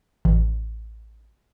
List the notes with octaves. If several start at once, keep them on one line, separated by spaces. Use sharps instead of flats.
A1